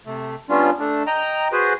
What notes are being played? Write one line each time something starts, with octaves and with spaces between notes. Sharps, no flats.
C3 A3
G3 B3 C#4 D4 F4
A3 D4
D#5 G5 A#5
F#4 G#4 B4 C5